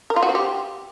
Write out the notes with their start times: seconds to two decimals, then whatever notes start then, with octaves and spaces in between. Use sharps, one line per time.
0.10 A#4
0.16 F4
0.23 F#4
0.29 C4
0.35 G4